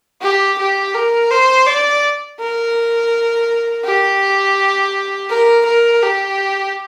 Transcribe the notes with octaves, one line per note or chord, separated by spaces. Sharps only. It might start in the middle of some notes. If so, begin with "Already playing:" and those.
G4
G4
A#4
C5
D5
A#4
G4
A#4
A#4
G4